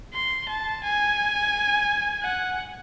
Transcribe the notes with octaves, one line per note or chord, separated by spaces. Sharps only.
C6
A5
G#5
F#5